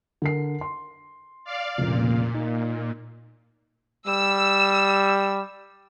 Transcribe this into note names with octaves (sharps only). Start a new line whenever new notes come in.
D3 A#4 C7
C6
D5 F5
F1 C#2 A#2
D#4
G3 E6